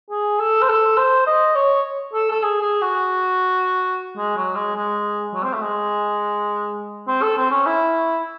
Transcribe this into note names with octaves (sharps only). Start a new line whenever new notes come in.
G#4
A4
C5
A4
C5
D#5
C#5
A4
A4
G#4
G#4
F#4
G#3
F#3
G#3
G#3
F#3
C4
A3
G#3
C4
A4
C4
C#4
E4